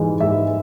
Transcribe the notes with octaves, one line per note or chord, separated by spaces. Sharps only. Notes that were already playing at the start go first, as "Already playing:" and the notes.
Already playing: G#2 E3 G#3
G#2 E5